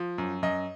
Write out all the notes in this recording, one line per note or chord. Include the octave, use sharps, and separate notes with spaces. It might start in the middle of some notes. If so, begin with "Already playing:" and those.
Already playing: F3
F#2
F#2 D#5